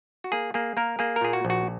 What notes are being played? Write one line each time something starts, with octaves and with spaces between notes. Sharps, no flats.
F#4
A#3 G#4
A#3 G#4
A#3 A#4
A#3 G#4
A#4
A#2 G#4
F#4
A#1
F#4